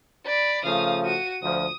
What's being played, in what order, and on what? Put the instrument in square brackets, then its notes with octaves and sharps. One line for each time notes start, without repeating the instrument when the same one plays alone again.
[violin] D5 B5
[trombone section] C#3 F3 A3 [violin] F5 D#6
[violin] F#4 D#7
[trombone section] D2 F3 [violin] D#6